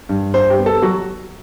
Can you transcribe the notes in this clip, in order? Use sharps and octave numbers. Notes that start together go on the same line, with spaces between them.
G2
G2 C5
G4
B3
A4
F#3 F#4